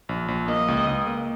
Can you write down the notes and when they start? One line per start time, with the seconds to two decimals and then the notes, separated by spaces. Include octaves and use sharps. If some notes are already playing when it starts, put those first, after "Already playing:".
0.09 A#1
0.28 A#1
0.48 A#3 D#5
0.68 C#2
0.87 C#2
1.07 A#3